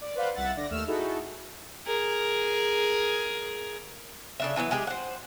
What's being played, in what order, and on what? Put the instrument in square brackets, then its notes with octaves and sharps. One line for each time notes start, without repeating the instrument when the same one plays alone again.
[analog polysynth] D5
B4 C5 D5 F5 F#5
C2 E5 F#5 A6
D3 D5 A#6
D#2 A3 E6 F6 E7
D#4 E4 F#4 G#4 A4
[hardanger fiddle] G#4 A#4
[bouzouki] C#3 D4 E5
D3 E3 F#3 B3
G#3 G4 G#4
C5 F#5